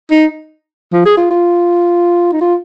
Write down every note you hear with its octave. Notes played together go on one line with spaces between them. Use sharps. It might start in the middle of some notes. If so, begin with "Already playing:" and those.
D#4
F3
G#4
F4
F4
D#4
F4